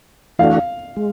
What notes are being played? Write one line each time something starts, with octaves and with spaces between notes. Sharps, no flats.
E3 A3 D4 F#4 F5
G#3